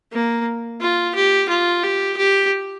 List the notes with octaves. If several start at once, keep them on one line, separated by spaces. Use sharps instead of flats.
A#3
F4
G4
F4
G4
G4